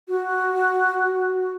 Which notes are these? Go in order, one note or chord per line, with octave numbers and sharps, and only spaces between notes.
F#4